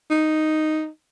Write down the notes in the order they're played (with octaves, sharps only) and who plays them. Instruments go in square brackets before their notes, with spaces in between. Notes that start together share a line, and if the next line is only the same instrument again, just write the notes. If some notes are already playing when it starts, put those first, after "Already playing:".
[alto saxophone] D#4